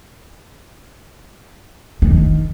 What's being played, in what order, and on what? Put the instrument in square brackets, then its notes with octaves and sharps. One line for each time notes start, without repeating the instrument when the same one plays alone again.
[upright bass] D#3